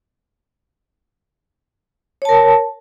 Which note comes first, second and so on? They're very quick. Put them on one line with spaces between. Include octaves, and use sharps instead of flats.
C#5 A5 A#4